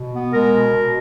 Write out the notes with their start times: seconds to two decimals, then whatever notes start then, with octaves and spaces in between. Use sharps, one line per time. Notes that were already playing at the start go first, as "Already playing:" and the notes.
Already playing: B2
0.12 B3
0.32 G#3 A#4
0.52 B2
0.73 B2